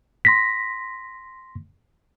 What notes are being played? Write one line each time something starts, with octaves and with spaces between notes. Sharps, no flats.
C6 A#6 B6